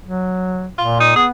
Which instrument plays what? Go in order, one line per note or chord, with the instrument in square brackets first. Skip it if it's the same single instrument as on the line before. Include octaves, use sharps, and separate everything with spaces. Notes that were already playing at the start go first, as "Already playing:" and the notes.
[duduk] F#3
[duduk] A#2 [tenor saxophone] F4
[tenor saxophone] D#4
[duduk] B3 [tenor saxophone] G#4